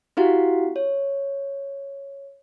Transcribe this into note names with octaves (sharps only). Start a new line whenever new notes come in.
C4 E4 F#4 G4 F5 F#5
C#5